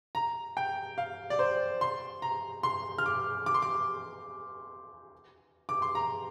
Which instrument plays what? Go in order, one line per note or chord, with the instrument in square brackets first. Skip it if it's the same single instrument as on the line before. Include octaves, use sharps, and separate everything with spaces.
[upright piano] A#5
G5
F5
D5
C5
C6
A#5
C6
F6
D6
D6
C6
D6
D6
C6
A#5